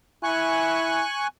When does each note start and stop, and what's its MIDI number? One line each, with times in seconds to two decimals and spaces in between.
0.23 1.03 64
0.23 1.27 80
0.23 1.27 85
0.23 1.27 90